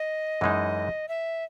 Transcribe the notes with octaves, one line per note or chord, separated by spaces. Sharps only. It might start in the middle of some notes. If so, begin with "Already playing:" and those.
Already playing: D#5
F#2 E3 G#3 D#4
E5